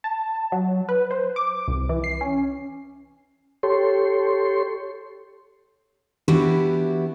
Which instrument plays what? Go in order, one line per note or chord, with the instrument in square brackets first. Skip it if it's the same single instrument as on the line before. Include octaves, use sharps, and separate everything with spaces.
[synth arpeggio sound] A5
F#3
B4
C5
D6
C2
E3
C7
C#4
[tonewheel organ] G4 A4 C#5 C6
[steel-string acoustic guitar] E3 B3 D4 E4 F#4 G4